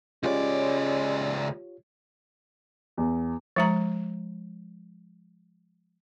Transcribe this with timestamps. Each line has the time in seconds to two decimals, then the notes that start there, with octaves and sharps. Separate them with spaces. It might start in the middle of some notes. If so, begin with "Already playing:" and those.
0.23 C#2 G#3 C#4 F4 G4 C#5 D5
2.98 E2
3.56 F3 G#3 A#5